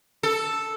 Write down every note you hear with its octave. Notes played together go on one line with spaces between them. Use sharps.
A4